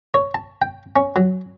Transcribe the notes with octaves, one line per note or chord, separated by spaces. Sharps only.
C#5
A5
G5
C#4
F#3